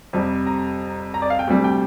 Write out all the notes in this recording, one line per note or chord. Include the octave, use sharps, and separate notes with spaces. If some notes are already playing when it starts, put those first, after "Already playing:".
F2 C3 G3
A#5
A#5
D5
F5
G5
D2 C3 G3
G5